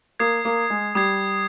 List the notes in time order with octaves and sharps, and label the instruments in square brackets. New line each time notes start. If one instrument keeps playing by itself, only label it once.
[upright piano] A#3 [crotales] D#6 G#6 C7
[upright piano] A#3
G#3
[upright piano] G3 [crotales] D#6 G#6 C7